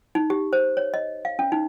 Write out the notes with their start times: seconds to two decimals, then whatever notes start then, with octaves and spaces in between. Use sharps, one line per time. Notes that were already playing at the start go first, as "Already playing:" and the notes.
0.15 D#4
0.30 G4
0.53 C5
0.77 C#5
0.94 D#5
1.25 F5
1.39 C#4
1.52 D#4